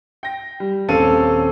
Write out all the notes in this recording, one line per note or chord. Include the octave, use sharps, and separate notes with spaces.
G5 A#6
G3
D#1 C4 C#4 A4 F5 D#7